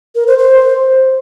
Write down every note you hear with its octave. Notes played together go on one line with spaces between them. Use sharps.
A#4
C5
C5